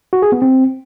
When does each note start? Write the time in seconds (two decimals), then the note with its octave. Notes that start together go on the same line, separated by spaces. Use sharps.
0.13 F#4
0.22 G#4
0.32 B3
0.42 C4